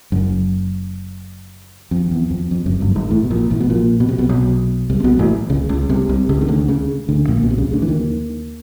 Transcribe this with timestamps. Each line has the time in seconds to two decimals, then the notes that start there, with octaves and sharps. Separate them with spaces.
0.12 F#1 F#2
1.91 F2
2.11 E2
2.31 F2
2.51 F2
2.66 F#1 F#2
2.80 G1 G2
2.91 A2
2.95 G#1 G#2
3.10 A1 A2
3.23 B2
3.30 A#1 A#2
3.50 A1 A2
3.60 B2
3.70 A#1 A#2
4.00 B2
4.09 C3
4.18 B1 B2
4.29 B1 B2
4.90 C2 C3
5.00 C3
5.04 B1 B2
5.19 A1 A2
5.50 C#2 C#3
5.69 C#2 C#3
5.89 C2 C3
6.09 C2 C3
6.29 C#2 C#3
6.41 D#3
6.48 D2 D3
6.68 C#2 C#3
7.09 D2 D3
7.28 A#1 A#2
7.43 B1 B2
7.50 C3
7.58 C#2 C#3
7.73 D2 D3
7.82 E3
7.88 D#2 D#3